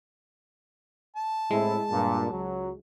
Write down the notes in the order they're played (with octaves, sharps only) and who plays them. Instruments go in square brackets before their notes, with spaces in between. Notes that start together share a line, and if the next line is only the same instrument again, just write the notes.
[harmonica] A5
[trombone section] A2 C4 E4 [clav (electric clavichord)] G#3
[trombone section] G2 A#2
C#2 F#3